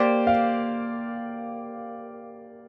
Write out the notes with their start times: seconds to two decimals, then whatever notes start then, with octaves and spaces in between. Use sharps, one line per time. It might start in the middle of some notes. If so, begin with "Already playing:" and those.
Already playing: A#3 G4 C5 D5
0.27 F5